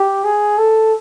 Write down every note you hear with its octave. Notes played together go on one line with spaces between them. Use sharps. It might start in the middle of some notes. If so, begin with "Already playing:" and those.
Already playing: G4
G#4
A4